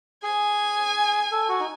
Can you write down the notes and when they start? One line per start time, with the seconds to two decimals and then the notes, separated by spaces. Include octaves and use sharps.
0.23 G#4 G#5
1.32 A4
1.49 F#4
1.60 D#4